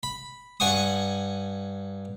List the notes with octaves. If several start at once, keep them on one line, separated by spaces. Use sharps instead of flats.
B5
G2 F#5 G#5 C#6 D#6